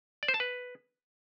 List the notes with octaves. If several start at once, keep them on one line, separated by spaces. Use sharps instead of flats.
D5
C5
A5
B4